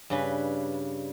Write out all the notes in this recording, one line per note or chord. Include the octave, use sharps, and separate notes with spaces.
G2 C#3 B4